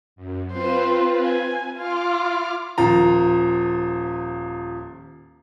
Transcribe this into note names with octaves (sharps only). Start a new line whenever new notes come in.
F#2
C4 F4 B4 C5
G#5
F4 D6 F6
D#1 F3 A#5